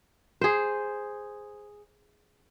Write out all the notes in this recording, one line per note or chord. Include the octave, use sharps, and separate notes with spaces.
G#4 C5